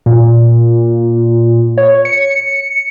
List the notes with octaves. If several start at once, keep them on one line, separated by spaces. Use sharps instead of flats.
A#2
C#5
C#7